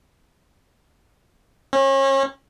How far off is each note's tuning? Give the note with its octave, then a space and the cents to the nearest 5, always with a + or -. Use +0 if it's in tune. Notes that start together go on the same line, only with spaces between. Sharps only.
C#4 -35